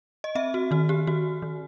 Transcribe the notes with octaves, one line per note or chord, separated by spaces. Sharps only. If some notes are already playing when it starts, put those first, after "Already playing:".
D#5
C4 E5
F#4
D#3 F#4
G4
D#3 F#4
D#3